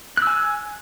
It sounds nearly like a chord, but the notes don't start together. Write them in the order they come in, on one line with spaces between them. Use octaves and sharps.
F#6 E6 G#5